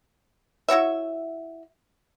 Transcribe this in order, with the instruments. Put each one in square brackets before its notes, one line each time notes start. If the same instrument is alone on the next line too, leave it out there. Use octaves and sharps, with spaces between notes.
[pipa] E4 F#4 C#5 E5